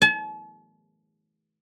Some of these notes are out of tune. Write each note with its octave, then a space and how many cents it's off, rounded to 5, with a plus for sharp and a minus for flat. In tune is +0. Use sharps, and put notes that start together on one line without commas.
A5 -45